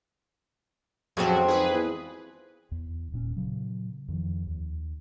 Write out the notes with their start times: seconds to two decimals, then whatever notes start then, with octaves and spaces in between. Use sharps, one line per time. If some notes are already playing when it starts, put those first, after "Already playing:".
1.17 F2 C#3 F3 F#3 C4 F#4
1.48 G#2 G#4 B4
1.71 E2
2.71 E2
3.12 D#1 A#2 B3 C#4
3.36 A#2 C#3 F#3
4.08 F2 D#3 F3
4.47 D#2